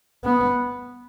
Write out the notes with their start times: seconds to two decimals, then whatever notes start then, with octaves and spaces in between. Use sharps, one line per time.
0.24 B3